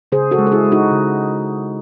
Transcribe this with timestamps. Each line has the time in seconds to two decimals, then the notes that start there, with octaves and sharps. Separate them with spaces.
0.12 C#3 G#4 C5
0.31 F#4 A4
0.39 G#3
0.47 A4
0.52 E4 G#4
0.65 G#3
0.72 D#4 F#4
0.91 C#3